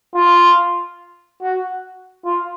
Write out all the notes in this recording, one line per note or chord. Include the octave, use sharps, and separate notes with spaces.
F4
F#4
F4